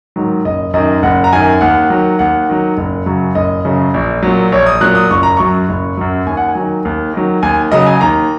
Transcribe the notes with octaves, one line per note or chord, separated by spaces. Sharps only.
G#2 D#3 F#3
F#1 D#5
F#2 D#3 D#5
F#1 F#5
A#5
F#2 D#3 G#5
D#2 F#5
D#3 F#3
D#2 F#5
D#3 F#3
F#1
F#2 C#3 F#3
F#1 D#5
F#2 C#3 F#3
A#1
A#2 F#3
A#1 C#5
D#6
A#2 F#3 F#6
D#6
F#1 C#6
A#5
F#2 F#3 C#6
F#1
F#2 F#3
D#2 G#5
F#5
G#5
D#3 F#3
D#2
D#3 F#3
D#2 G#5
C#3 F#3 D#5
G#5
D#2 A#5